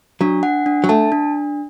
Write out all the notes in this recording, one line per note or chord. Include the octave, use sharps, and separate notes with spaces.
F#3 D4
F#5
D4
F#3
A3 A5
D4